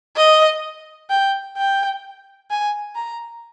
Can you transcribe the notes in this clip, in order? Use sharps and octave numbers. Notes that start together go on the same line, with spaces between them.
D#5
G5
G5
G#5
A#5